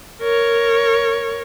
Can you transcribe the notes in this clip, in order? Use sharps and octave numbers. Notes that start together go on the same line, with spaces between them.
A#4 C#5